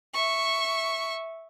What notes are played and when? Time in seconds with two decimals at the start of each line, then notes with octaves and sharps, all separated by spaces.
0.14 E5 C#6